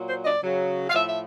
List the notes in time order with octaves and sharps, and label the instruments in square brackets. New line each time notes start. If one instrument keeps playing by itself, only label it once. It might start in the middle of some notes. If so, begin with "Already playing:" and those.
Already playing: [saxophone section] A#2 F#3
C5
D#5
D5
C#3 F#3
F5
A2 F3 E5
E5